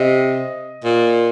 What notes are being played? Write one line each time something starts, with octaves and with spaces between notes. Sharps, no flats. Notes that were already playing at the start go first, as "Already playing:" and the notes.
Already playing: C3 D#5
A#2